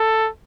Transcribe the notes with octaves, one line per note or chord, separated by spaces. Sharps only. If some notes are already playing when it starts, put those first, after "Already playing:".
Already playing: A4